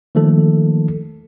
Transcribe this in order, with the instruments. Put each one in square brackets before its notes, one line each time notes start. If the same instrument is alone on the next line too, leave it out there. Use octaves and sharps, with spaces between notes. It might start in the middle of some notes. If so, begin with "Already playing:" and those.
[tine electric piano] D#3 F3 A3 A#3 A4